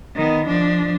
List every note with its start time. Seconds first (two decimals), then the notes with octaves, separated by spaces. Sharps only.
0.15 D#3 B3
0.47 F3 D4